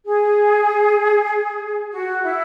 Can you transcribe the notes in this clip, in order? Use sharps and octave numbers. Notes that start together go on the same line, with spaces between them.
G#4
F#4
E4